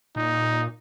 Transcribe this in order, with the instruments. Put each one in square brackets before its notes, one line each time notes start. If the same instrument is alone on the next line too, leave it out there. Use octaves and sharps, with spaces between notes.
[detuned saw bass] A#2 [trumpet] D#4